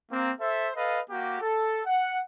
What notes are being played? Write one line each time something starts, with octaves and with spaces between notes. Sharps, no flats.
A#3 C4
A4 C5 E5
A4 B4 D#5 F5
A#3 F#4 G4
A4
F#5